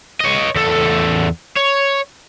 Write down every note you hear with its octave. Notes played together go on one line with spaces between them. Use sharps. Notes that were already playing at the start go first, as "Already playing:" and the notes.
C#5 D#5
E2 A4
C#5